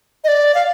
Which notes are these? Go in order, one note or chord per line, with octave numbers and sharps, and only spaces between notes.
D#5
D5
F5